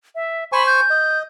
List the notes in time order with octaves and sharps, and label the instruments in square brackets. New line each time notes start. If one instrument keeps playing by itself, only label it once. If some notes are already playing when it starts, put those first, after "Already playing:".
[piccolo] E5
[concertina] C5 G#5 C#6 [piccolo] B5
[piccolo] G6
[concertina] D#5